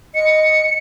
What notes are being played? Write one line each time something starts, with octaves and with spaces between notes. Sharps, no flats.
D#5 C#7